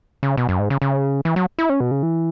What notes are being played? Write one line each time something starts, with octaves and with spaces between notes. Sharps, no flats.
C#3
B2
F#2
G#2
C#3
C#3
E3
F#3
E4
C#4
B2
C#3
E3